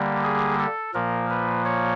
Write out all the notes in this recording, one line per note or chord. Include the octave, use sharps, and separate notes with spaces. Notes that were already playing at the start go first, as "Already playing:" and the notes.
Already playing: D3 G3 A#3
G#4
A4
A#2 F3 A#3 A#4
B4
C#5